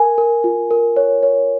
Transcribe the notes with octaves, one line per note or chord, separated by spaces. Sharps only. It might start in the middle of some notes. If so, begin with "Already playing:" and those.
Already playing: A#4 G#5
A#4
F4
A#4
C#5
C#5